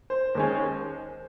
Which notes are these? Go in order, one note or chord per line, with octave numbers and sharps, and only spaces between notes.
C5
D#2 D#3 G#3 C#4